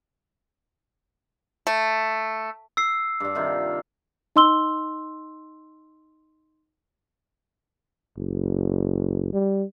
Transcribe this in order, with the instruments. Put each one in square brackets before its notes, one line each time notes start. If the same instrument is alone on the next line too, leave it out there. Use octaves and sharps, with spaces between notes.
[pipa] A3
[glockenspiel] E6 C7
[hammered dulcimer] G2 G3
C3 D#3 F4
[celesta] D#4 D#5 C6 E6 G7
[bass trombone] F#1
G3